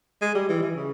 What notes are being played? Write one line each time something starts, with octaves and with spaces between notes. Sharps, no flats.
G#3
G3
E3
E3
C#3